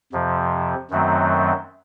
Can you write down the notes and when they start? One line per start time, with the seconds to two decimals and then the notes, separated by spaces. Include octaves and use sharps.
0.12 F2 C3 F3
0.90 F#2 D#3 F#3 A3 C4